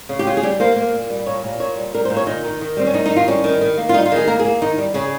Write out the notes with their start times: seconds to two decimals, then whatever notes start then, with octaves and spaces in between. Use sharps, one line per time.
0.09 C#3
0.19 G4
0.27 C#3 F4
0.37 G#4
0.43 G3 G4
0.60 A#3 C5
0.76 A#3
0.93 A#2
1.10 G3
1.26 A#2 C#5
1.44 A#2
1.60 A#2 C#5
1.77 G3
1.94 G3 A#4
2.05 C5
2.10 A#2
2.17 C#5
2.27 D#3 D#4
2.44 D#3
2.61 D#3
2.77 G3 C4
2.87 C#4
2.93 D#3 D#4
3.05 D#4
3.11 D#3
3.16 F4
3.28 G3 C#4
3.44 D#3
3.61 D#3
3.77 A#3
3.89 F4
3.94 G3 D#4
4.06 F4
4.12 D#3 G#4
4.27 A#3 A#4
4.39 G#4
4.45 A#3
4.62 D#3 D#4
4.78 G3
4.94 C#3 G#4